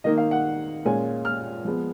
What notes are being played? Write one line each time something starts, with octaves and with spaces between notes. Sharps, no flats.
D#3 A#3 D#4 D#5
F5
F#5
A#2 G#3 C#4 F4 G#5
F6
F3 G#3 B3